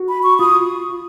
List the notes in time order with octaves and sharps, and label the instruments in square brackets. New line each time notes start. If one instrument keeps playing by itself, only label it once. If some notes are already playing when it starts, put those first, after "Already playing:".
Already playing: [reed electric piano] F#4
[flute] B5
C#6
[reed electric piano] F4 [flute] D#6